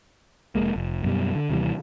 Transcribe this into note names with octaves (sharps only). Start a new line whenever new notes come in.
F1 D#2 G#3 A#3
F1
F#2 B2 G3
D3
D#2 C3 E3 G3